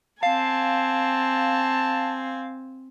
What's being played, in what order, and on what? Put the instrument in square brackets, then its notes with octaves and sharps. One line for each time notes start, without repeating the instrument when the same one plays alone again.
[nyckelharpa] C4 G#5 [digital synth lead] F5 [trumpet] A5